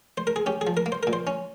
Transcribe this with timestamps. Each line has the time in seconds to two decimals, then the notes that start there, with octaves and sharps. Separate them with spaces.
0.18 C5
0.27 A#4
0.36 G#4
0.46 C#4 G4
0.61 G#4
0.67 F3
0.77 A#4
0.86 A#3
0.92 C5
1.03 A#2 A#4
1.13 C5
1.27 C#4